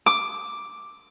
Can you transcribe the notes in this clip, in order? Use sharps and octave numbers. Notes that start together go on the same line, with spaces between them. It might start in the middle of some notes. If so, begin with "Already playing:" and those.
D6